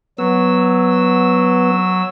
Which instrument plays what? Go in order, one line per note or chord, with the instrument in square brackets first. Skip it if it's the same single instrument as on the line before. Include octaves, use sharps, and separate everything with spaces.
[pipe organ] F#3 E6 [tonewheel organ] B3